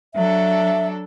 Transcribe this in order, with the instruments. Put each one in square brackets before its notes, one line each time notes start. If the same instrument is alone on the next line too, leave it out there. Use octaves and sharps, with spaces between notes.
[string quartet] F#3 D4 A4 [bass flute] E5